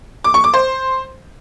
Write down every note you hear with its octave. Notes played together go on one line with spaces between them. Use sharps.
D6
C#6
D6
C5